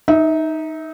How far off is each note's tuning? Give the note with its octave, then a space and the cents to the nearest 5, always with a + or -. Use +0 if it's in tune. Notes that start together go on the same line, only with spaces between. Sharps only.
D#4 +0 E5 -30